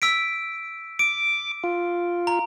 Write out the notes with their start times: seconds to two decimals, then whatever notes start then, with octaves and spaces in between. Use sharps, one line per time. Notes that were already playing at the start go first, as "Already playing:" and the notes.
0.02 E6 B6 D7
0.99 D6 D7
1.64 F4
2.27 A#5